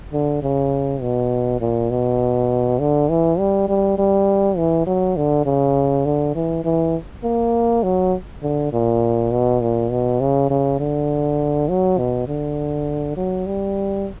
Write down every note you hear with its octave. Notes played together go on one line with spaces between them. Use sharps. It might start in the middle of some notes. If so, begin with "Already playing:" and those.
D3
C#3
B2
A#2
B2
D3
E3
G3
G3
G3
E3
F#3
D3
C#3
D3
E3
E3
A#3
F#3
D3
A#2
B2
A#2
B2
C#3
C#3
D3
F#3
B2
D3
F#3
G3